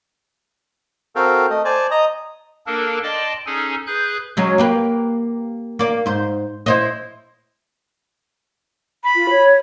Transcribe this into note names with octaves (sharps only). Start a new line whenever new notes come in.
C4 F#4 A4 A#4 F5 G5
A3 D#5
C5 D5 G#5 A5
D#5 A#5 D#6
A#3 D4 A4 A#4
D5 D#5 G5 A5 C6 D6
C#4 D#4 G#4 A4 G#5
G#4 B4 F#6 G6
F#3 G#3 C#4
A#3 G4 B4
A#3 D5
G#2 C5
E4 C5 D#5
B5
F4
C#5